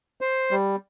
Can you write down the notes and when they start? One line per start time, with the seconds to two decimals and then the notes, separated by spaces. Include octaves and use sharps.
0.21 C5
0.51 G3